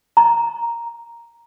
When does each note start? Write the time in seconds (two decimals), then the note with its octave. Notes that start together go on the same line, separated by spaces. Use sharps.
0.17 A#5